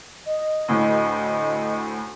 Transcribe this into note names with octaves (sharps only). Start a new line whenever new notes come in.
D#5
D2 A2